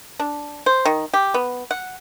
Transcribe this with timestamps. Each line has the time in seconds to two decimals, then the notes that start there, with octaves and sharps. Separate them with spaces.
0.19 D4
0.66 C5
0.85 D#3
1.13 G4
1.34 B3
1.71 F#5